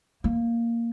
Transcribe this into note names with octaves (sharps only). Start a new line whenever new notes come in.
A#3